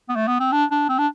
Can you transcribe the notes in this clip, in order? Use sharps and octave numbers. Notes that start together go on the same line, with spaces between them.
B3
A3
B3
C4
D4
D4
C4
D4